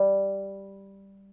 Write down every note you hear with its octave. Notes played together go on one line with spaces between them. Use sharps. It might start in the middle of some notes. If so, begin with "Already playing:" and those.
Already playing: G3